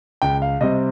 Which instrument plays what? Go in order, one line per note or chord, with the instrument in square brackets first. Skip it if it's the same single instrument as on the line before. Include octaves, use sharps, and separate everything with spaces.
[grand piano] C#2 G5
F5
C3 G3 C4 D#5